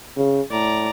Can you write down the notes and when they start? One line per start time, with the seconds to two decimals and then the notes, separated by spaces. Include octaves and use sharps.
0.17 C#3
0.51 A2 D5 A#5